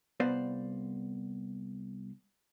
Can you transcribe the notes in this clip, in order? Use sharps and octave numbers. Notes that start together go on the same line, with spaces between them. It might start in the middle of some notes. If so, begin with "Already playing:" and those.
C2 B3 C5 D5 F5